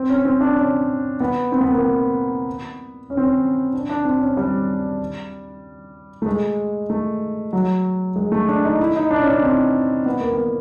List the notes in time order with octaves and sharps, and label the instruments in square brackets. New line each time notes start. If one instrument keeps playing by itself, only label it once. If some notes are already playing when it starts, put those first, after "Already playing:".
Already playing: [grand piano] C4
C#4
C4
D4
C#4
B3
C4
B3
A#3
B3
C#4
C4
C#4
D4
D4
C4
C#4
G3
A3
G#3
A3
F#3
G#3
A3
D4
D#4
E4
D#4
D4
C#4
D4
C4
B3
A#3
B3